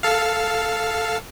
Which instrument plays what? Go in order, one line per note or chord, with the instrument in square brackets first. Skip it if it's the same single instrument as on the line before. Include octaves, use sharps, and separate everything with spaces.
[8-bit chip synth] A4 F5